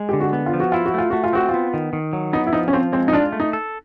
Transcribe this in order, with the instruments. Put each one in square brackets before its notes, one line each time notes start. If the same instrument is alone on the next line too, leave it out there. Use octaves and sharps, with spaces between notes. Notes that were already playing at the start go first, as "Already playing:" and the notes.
Already playing: [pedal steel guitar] G#3
[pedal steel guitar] D3 [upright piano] G4
[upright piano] F#4
[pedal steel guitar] B3
[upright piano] F4
[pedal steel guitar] F3
[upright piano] F#4
[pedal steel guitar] E4 [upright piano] F4
[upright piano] F#4
[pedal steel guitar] A3 [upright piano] F4
[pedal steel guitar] A3 [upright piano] F#4
[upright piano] F4
[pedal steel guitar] C4 [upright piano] F#4
[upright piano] F4
[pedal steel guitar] B3
D#3
D#3
F#3
[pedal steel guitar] B3 [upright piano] D#4
[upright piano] E4
[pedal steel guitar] F3 [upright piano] D#4
[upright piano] C#4
[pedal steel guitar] F3 [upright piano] C4
[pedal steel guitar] G#3 [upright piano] C4
[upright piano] D#4
[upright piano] D4 [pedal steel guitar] F4
[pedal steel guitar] A3
[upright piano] D#4
[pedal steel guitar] A4